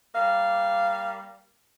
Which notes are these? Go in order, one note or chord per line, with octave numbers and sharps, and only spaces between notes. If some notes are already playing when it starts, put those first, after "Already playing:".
G3 A#3 F5